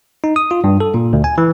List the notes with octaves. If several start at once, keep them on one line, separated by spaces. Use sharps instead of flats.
D#4
D#6
F4
G2
A4
A#2
D2
G#5
E3